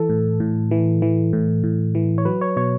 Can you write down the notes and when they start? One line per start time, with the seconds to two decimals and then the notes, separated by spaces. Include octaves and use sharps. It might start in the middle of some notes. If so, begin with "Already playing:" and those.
Already playing: E3 A4
0.09 A2
0.40 A2
0.71 E3
1.02 E3
1.33 A2
1.64 A2
1.95 E3
2.18 C#5
2.25 F#3 B4
2.41 C#5
2.56 B2 C#5